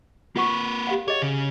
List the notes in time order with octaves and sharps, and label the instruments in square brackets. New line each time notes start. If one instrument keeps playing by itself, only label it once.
[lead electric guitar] A#3 B4 [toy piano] F4 F#5 C#6
[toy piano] G4 F5 F#5
[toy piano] G#4 D#5 [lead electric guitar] C#5
[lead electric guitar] C#3